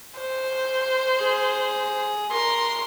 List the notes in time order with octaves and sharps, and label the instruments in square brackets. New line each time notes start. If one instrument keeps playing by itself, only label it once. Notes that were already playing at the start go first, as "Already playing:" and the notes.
[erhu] C5
[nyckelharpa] G#4
[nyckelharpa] A#4 [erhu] C6